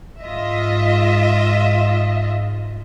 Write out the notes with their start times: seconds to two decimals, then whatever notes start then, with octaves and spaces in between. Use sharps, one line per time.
0.21 G#2 F4 D#5 E5